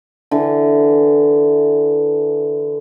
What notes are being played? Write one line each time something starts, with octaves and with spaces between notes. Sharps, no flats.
D3 E3